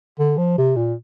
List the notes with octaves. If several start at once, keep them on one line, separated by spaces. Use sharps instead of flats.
D3
F3
C3
A#2